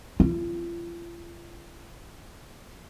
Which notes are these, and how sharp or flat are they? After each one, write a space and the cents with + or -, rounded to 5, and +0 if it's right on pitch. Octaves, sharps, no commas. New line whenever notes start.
F4 -40